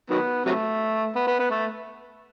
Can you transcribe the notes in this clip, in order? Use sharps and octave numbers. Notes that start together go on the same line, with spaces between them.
D#3 F#3 B3
C3 F#3 A3
B3
B3
B3
A3